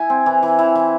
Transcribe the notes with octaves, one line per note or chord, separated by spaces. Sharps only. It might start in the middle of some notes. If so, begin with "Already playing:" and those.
Already playing: E4 G#5
C4
E3
E3
E3
E3